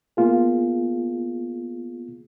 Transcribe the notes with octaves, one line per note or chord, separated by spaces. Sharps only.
A#3 B3 F4 G#4